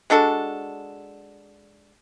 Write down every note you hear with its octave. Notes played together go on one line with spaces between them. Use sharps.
G#3 D4 F#4 A4